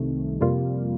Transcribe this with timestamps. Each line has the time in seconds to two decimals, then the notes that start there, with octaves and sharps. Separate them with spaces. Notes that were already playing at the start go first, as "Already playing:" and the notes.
Already playing: C2 C3 D#3 A3
0.41 F2 C3 G3 A#3 F4